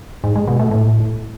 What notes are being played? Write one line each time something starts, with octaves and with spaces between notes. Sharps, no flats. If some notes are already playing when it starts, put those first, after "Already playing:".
G#2
G#3
B2
A3
A2